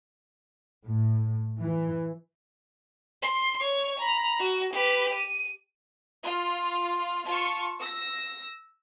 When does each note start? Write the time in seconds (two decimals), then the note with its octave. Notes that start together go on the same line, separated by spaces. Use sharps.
0.85 A2
1.59 E3
3.22 C6
3.61 C#5 C#6
3.99 A#5 B5
4.40 F#4
4.73 G4 B4
5.14 D#7
6.25 F4
7.26 F4 A5 C#6
7.80 E6 A#6